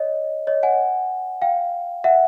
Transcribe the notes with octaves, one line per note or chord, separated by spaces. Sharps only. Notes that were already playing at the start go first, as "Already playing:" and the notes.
Already playing: C#5 D#5
C#5 D#5
F#5 G#5
F5 G5
E5 F#5